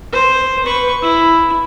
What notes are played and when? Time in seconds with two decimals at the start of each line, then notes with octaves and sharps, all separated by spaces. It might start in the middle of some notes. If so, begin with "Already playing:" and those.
0.12 C5
0.66 B4 C#6
1.03 E4